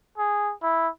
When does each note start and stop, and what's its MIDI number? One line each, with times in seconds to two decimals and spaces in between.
0.18 0.53 68
0.63 0.89 64